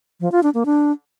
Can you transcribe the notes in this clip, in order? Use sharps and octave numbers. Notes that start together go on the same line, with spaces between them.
F3
F4
D4
A#3
D4